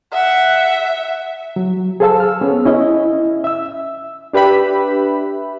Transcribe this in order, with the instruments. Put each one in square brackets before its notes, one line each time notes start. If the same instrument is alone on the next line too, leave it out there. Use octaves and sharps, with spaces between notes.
[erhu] E5 [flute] F#5
[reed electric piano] F#3
G#4 A4 C5 F5 A5 E6
E6 F6
B3 C#4 G#4
C#4 E4 D#5 E5
E5 E6
[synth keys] D4 G4 B4 E5 B5